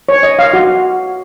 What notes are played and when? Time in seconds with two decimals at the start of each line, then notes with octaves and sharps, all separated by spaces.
0.09 C#5
0.23 D#5
0.39 F5
0.53 F#4